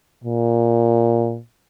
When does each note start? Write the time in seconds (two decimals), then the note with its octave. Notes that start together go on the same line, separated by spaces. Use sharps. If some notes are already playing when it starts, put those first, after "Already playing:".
0.24 A#2